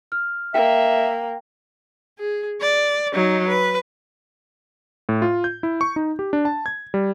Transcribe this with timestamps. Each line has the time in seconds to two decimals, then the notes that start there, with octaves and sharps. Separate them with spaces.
0.12 F6
0.54 A#3 E5 G5
2.19 G#4
2.61 D5
3.14 F#3 D#4
3.48 B4
5.09 A2
5.22 F4
5.44 G6
5.63 E4
5.81 C#6
5.96 D#4
6.19 G4
6.33 D4
6.45 A5
6.66 G#6
6.94 G3